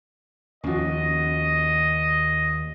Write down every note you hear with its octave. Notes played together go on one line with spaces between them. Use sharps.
D#2 F3 C#4 F#4 D#5